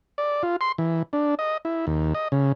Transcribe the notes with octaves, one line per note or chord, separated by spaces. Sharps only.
D5
F4
C6
E3
D4
D#5
E4
D#2
D#5
C#3